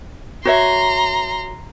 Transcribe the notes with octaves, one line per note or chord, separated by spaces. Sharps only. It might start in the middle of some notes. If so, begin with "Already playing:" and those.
F#4 C#5 E5 A#5 C6